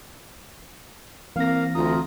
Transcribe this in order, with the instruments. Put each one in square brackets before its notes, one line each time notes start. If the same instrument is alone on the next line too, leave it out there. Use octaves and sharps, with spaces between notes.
[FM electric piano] E3 C4 A#6 [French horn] A#3 [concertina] F5
[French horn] D2 [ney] F4 [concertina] A#5 D#6